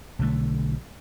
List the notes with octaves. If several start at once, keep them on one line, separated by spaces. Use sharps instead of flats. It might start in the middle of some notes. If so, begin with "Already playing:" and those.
B1 D3 A3